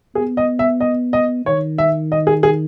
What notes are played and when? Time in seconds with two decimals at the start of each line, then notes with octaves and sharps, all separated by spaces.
0.15 B3 G#4
0.37 D#5
0.59 E5
0.80 D#5
1.13 D#5
1.46 D#3 C#5
1.78 E5
2.12 D#5
2.27 G#4
2.43 G#4